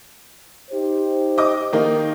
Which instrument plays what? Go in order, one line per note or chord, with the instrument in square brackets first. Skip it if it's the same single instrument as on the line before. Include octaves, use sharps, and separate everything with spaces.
[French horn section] D#4 G4 C5
[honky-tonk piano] D#5 D6
D#3 A#3 D#4